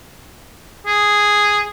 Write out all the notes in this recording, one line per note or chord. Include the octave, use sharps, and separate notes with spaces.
G#4